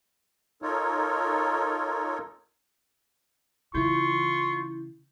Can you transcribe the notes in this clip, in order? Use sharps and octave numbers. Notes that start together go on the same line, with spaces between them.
D#4 F4 A4 A#4 C#5
C#3 E3 E4 F4 C#6 G6